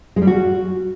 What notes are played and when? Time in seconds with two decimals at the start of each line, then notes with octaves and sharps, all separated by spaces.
0.16 G#3
0.22 G3
0.27 F#4